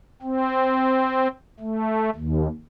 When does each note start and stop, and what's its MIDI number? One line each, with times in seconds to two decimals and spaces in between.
0.22 1.28 60
1.60 2.10 57
2.15 2.47 39